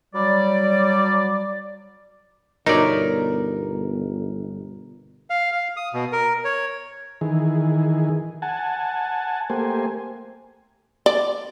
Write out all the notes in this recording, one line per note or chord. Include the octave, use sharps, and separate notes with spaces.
F#3 G3 D5
G1 B2 D#4 A#4 C#5 D5 E5
F5
F5
D#6
B2
A#4
C#5
D#3 E3 G#4
F#5 G#5 A5
A3 A#3 G4 C5 G#5
D5